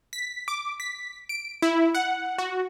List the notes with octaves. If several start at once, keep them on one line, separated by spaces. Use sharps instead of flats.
B6
D6
B6
D7
E4
F#5
F#4